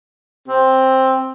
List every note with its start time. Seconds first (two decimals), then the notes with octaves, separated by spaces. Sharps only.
0.48 C4